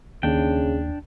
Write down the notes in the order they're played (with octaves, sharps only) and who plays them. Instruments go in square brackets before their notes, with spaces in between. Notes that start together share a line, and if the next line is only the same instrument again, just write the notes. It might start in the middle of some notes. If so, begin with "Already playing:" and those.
[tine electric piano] D#2 [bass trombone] C#3 [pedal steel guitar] D4 G5